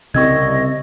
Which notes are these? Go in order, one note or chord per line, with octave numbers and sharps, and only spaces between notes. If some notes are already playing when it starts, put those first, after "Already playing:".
C2 C#3 C4 D#5 C#6 E6 G#6